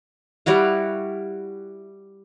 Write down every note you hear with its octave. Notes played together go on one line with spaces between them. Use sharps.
G3 E4 F#4 F5